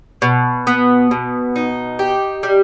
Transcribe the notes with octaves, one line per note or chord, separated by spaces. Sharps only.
B2
B3
B2
D#4
G4
G3